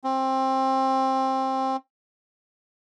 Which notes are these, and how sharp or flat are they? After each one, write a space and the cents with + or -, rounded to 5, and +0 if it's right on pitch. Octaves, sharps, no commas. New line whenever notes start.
C4 +20